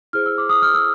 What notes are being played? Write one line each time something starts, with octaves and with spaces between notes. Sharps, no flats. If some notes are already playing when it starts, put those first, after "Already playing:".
E4 G#4 C5 F6
E6
D6
D#6
F6
E6